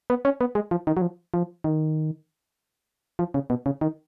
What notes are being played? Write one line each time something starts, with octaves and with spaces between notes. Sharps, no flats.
B3
C#4
B3
G#3
F3
D#3
F#3
F3
F3
D#3
F3
C#3
B2
C#3
D#3